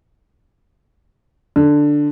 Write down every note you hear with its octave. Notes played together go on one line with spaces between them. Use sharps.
D3